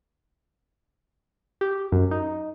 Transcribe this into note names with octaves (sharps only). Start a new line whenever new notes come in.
G4
F#2
D#4